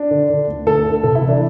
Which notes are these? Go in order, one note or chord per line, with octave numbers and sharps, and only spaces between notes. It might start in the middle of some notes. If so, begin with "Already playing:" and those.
Already playing: D4
D3
D3
D2
D2 A4
D3
C3 A4
E4
E3
D4